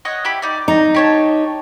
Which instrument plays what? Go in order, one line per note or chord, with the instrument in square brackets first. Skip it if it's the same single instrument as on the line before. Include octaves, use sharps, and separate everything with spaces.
[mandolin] C#5 D#5 F#5
E4 G4 B5
D#4 D5
[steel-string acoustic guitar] D#4 [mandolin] A#5
[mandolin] G4 C#5 A5